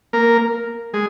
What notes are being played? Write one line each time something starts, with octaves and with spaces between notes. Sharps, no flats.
A#3 A#4
G#3 G#4